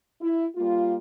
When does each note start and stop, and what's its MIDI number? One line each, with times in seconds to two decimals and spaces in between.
0.20 0.46 64
0.56 0.96 55
0.56 0.96 58
0.56 0.96 65